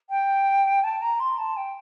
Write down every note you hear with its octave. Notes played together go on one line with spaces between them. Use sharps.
G5
A5
A#5
C6
A5
G5